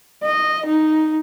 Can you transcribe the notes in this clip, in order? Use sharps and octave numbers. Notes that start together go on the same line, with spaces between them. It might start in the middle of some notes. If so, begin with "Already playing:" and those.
D#5
D#4